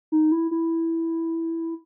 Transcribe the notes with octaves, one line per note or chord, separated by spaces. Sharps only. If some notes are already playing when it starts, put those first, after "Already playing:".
D#4
E4
E4